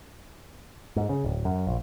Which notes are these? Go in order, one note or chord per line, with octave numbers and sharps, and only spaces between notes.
G#2
C#3
D1
F#2
A#1